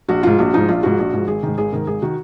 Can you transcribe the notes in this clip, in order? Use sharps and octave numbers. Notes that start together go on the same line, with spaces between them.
A#1 F#4
G#2 F3 F4
A#1 F#4
G#2 F3 D#4
A#1 F4
G#2 F3 F#4
A#1
G#2 F3
G#1 G#4
G#2 D#3
G#1 G#4
G#2 D#3 A#4
G#1 G#4
D#3 F#4